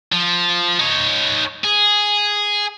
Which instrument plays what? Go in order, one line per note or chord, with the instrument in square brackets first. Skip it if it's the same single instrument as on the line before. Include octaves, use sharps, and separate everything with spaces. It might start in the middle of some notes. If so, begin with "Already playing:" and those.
[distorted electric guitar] F3
D#4 C#5
G#4